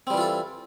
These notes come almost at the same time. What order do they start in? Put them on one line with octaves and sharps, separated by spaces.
C4 G3 E3 F4 A4